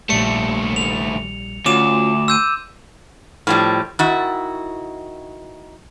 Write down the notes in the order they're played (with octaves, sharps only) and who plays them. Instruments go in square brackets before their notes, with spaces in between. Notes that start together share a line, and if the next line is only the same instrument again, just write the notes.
[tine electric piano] A#1 G3 [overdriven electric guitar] D#2 A3 [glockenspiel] C#7
[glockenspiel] F7
[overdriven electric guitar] D2 [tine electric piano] C#4 F4 F#4 [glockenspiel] D6 E7
[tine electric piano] C6 [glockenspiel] E6 G6 D#7
[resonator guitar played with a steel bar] A2 F3 G3
D#3 E4 F#4